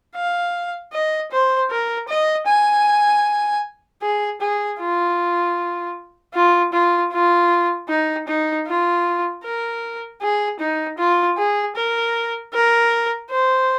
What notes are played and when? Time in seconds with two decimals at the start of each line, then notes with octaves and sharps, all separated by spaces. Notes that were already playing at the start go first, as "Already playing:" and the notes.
0.16 F5
0.93 D#5
1.31 C5
1.70 A#4
2.09 D#5
2.47 G#5
4.02 G#4
4.40 G#4
4.80 F4
6.34 F4
6.72 F4
7.12 F4
7.89 D#4
8.27 D#4
8.67 F4
9.44 A#4
10.21 G#4
10.59 D#4
10.98 F4
11.37 G#4
11.76 A#4
12.53 A#4
13.30 C5